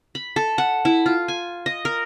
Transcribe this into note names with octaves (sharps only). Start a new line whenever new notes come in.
B5
A4
F#5
E4
F4
G#5
D#5
A#4